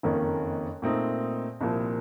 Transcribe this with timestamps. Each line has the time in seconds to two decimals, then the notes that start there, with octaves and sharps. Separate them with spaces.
0.03 F#1 F2 D#3 A#3 C#4
0.82 A#2 A3 C4 D#4
1.61 C2 A#2 F3